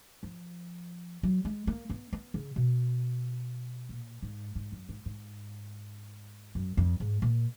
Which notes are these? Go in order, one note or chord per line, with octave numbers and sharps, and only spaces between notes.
F3
F#3
G#3
A#3
B3
B3
C#3
B2
A#2
G#2
G#2
F#2
G#2
G#2
F#2
F2
G#2
A#2